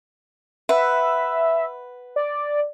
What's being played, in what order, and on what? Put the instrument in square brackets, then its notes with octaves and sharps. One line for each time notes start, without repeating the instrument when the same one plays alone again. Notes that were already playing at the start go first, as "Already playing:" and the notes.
[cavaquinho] B4 F#5 [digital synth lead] E5
[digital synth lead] D5